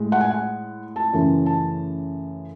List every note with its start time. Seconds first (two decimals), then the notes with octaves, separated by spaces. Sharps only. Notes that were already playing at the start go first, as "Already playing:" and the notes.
Already playing: A2 G#3
0.12 F#5
0.21 G#5
0.31 F#5
0.96 A5
1.13 F#2 C#3 E3 A3
1.46 A5